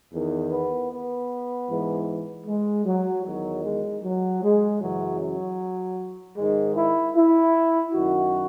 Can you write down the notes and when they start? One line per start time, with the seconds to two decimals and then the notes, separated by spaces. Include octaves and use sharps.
0.12 E2 D#3
0.51 B3
0.90 B3
1.68 G#2 E3
2.46 G#3
2.85 F#3
3.24 E2 D#3 F#3
3.63 G#3
4.03 F#3
4.42 G#3
4.80 F#2 C#3 E3 F#3
5.20 F#3
6.36 G#2 D#3 G#3
6.76 E4
7.14 E4
7.93 F#2 D#3 F#4